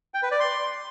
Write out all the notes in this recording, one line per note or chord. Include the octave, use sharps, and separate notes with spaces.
G5
B4
D5
C6